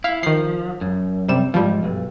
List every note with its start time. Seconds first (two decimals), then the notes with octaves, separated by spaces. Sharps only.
0.04 E4 F5
0.23 D#3 F3 C7
0.81 F#2
1.28 C3 G3 E7
1.54 C#2 G#2 F3 G3
1.83 B1 G2